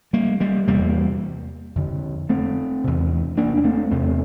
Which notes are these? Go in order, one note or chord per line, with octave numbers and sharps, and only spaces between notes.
G3 A#3
G3 A#3
E2 C3 G3 A#3
F2 D3
A3 C4
E2 C3
A#3 D4
D4
A3 C4
E2 C3 A3 C4